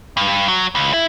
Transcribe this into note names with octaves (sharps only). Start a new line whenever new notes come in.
G2
F#3
C#2
E4